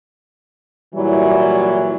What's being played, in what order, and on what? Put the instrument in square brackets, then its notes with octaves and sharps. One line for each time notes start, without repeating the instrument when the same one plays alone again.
[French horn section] A#2 E3 F#3 G3 E4